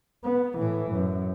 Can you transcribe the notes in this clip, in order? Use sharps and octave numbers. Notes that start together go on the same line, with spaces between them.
B3
A2 E3
F#2